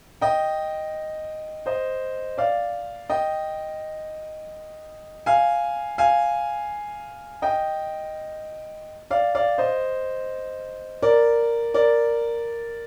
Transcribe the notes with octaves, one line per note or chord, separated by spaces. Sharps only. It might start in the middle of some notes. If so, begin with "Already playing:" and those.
D#5 G5
C5 D#5
D5 F5
D#5 G5
F5 G#5
F5 G#5
D#5 G5
D5 F5
D5 F5
C5 D#5
A#4 D5
A#4 D5